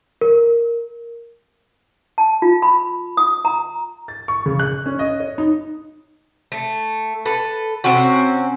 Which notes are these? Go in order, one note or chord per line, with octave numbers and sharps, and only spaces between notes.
A#4
A5
F4
B5
D#6
A#5
A6
C#6
C#3
F#6
C#4
D#5
C#5
D#4
A3
A4 B4
C3 C4 C#4 F#4